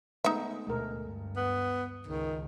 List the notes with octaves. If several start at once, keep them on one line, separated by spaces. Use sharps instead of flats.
G#3 A3 B3 D#4 E5
D2 B2 G#3 A3 A#4
G2
B3
C#2 D#3